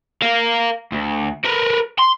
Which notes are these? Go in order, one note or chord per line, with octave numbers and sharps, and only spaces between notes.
A#4 F5
D2
A#4 B4
C6